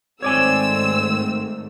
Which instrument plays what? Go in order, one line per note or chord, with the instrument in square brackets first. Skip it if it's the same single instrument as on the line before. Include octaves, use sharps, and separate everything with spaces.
[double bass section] G#2 D#3 A3 [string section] C4 [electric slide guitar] C#5 D5 G#5 [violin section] E6